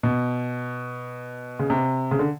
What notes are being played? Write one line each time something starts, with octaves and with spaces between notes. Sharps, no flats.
B2
C#3
C3
C#3
D3